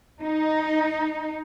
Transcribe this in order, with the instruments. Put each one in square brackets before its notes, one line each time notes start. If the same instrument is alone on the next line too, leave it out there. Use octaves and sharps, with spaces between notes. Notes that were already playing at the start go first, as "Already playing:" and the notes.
[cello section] D#4